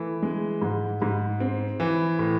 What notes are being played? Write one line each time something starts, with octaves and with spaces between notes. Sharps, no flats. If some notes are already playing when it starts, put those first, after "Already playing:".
Already playing: E3 A3
G#3
G#2
G#2
C4
E3
A2